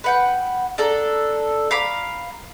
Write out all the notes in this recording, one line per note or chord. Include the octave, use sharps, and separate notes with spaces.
B4 F#5 G5
D4 A4 A#5
F5 A#5 B5 D6